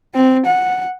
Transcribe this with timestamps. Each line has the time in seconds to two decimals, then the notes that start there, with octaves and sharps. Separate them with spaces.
0.15 C4
0.46 F#5